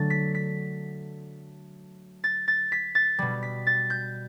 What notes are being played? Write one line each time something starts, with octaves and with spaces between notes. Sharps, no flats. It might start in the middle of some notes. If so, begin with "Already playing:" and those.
Already playing: D3 F#3 A3 A6
B6
B6
A6
A6
B6
A6
B2 G3
B6
A6
G6